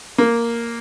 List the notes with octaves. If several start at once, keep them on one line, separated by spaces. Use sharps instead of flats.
A#3